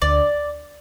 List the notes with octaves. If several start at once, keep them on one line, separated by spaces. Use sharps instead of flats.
D2 D5